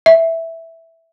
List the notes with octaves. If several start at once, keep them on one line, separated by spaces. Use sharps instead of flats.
E5